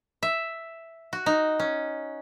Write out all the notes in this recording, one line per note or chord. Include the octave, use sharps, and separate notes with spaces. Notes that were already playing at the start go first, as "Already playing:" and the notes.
E5
F#4
D#4
C#4